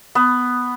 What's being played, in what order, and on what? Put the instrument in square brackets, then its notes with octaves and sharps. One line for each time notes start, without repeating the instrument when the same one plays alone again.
[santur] B3